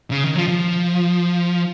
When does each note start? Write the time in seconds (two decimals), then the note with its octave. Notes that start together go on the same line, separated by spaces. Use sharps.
0.11 C#3
0.24 D#3
0.36 F3
0.48 F3